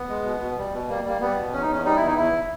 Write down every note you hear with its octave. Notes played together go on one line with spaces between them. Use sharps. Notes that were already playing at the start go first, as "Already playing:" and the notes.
Already playing: B3
G#3
B2
B2
G3
B2
G3 A#3
G3 A#3
G3 B3
B2
E2 C#4
D#4
E2 C#4
G3 D#4
E4
E2 D#4
E2 E4